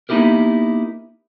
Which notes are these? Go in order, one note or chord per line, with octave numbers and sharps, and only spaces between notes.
A#3 B3 D#4 E4 G4 A#4